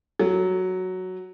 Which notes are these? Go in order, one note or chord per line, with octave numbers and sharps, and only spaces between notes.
F#3